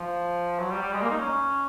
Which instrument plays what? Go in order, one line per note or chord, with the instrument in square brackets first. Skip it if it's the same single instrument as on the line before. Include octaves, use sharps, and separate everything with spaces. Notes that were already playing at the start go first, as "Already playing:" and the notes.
Already playing: [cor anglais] F3
F#3
G3
G3
G#3
A#3
D#4
C#4